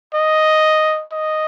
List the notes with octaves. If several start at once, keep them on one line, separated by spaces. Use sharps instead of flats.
D#5
D#5